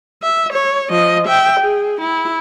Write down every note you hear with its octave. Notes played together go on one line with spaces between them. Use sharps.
E5
C#5
F3 D#5
E5 G5
G#4
E4